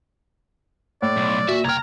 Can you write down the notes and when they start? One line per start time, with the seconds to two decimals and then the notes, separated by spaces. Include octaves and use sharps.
1.02 A2 D5
1.17 B1
1.49 A#2 F#4 E5
1.65 C2 G5 A#5 F6 G#6